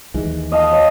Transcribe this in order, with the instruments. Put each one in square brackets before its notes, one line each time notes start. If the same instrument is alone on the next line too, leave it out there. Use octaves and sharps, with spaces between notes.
[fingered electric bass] D#2 E3 G#3
[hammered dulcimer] D#5 F5 A5
C#5